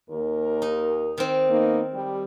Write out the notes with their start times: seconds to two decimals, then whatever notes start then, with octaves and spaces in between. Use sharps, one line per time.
0.10 D#2 A#4
0.62 D#4
1.18 D#3 C4
1.50 A#3 B3 D#4
1.94 G3